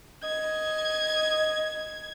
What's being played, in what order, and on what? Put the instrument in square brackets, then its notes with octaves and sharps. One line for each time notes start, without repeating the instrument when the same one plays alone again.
[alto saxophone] D#5 [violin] G#6